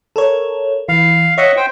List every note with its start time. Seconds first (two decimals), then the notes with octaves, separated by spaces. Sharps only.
0.16 A4 A#4 C#5
0.89 E3 F5
1.38 C#5 D#5 E5 F#5
1.57 C5 G5